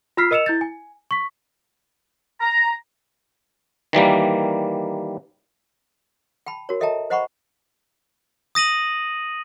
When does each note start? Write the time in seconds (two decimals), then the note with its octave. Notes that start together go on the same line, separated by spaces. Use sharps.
0.17 F4 B5 E6 F6 B6 C7
0.31 A#4 D#5 E6 C#7 E7 F7
0.46 E4 G6 A6
0.61 G#5
1.11 C#6 B6
2.41 A#5
3.93 D#3 E3 G3 A#3
6.46 G5 A5 B5
6.69 F#4 A#4 C#5
6.80 A4 D#5 E5 G5 A5 A#5
7.10 C5 D#5 F#5 A#5 B5 C#6
8.55 D#6 A#6 D#7 F#7